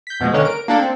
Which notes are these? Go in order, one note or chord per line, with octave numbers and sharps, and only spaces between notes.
G6 B6
E2 B2 F3 G#3
D3 D#3 A#3 C#4 B4 C#5
A#4 D7
A#3 D4 A4
C4